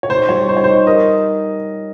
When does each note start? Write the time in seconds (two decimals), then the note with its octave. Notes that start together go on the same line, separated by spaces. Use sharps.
0.03 C#5
0.10 D#4 C5
0.29 G3 C#5
0.48 D#4 C5
0.57 C#5
0.64 D#4 C5
0.87 A#4 D#5